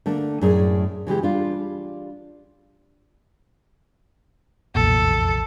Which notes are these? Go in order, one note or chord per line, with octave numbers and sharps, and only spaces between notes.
D3 A3 A#3 D4
F#2 A2 A3 G#4 A#4 D5
C#3 E3 G#3 G4
G3 D4 F4
F1 B1 E2 A#2 A#3 A4